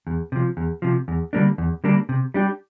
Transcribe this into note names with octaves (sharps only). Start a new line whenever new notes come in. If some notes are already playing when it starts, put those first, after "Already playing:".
E2
C3 F3
E2
C3 F3
E2
D3 G3 A#3 D4
E2
D3 G3 A#3 D4
C3
G3 D4 G4